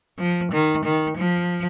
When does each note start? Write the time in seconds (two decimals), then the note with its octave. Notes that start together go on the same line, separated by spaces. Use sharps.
0.18 F3
0.52 D#3
0.84 D#3
1.17 F3